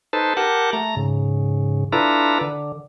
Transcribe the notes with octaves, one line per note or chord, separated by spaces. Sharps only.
D#4 A4 B4 C5 A5
G4 A#4 F#5 A5
A3 A#5
G#2 C#3
D4 E4 F4 A4 B4 A#5
D3